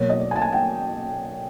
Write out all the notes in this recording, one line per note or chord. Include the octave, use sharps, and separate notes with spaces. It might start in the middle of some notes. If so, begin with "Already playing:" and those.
Already playing: B2 F#3 A#3 C#5
D#5
D5
G#5
A5
G#5
G5